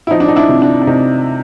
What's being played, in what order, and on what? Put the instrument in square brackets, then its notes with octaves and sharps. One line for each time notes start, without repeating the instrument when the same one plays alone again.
[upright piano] E4
F3 D#4
D4
D#4
D4 E4
C3
D4
D4
C3 D#4